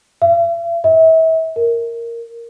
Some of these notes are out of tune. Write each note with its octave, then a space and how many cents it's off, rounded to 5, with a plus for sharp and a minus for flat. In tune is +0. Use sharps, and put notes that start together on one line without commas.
E5 +45
E5 -35
A#4 -5